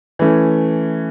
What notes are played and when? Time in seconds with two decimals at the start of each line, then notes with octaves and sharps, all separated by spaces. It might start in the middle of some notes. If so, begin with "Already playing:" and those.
0.19 E3 A3 C#4